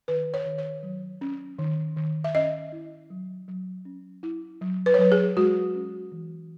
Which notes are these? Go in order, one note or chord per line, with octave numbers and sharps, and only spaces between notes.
D#3 B4
C#5
D#3
C#5
F#3
C#4
D#3
D#3
E5
C#4 D#5
E4
F#3
F#3
C#4
E4
F#3
B4
C#5
F#3 B4
G#4
G#3 F#4
C#4
E3